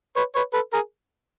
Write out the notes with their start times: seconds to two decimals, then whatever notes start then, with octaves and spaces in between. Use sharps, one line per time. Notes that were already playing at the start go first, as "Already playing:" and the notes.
0.16 B4 C#5
0.35 B4 C#5
0.53 A4 B4
0.73 G#4 A#4